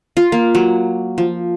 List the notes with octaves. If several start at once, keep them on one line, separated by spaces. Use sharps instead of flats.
F4
A#3
F#3
F3